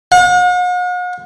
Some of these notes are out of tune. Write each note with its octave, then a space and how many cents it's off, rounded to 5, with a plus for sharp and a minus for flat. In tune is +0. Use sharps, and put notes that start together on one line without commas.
F#5 -45